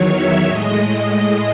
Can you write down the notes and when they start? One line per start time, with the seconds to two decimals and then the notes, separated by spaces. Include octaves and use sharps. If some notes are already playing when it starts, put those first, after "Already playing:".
Already playing: E2 D#3 F#3 C#5
0.15 E5
0.48 A2 G#3 D#5